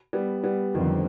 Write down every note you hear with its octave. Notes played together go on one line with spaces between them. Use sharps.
G3 B3
G3 B3
F2 D3 D#3 F3 G3 C4